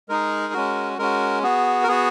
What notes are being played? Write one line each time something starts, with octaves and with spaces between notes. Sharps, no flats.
G#3 D#4 G#4 A#4
G#3 C#4 F#4
G#3 C#4 F#4 A#4
B3 F#4 G#4
A#4
B3 F#4 G#4